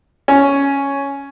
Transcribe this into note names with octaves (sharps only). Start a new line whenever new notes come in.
C#4